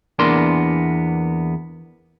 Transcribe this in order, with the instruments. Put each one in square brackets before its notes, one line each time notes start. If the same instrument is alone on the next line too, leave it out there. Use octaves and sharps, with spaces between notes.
[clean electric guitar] E2 A#3 B3 D4 A#4 C6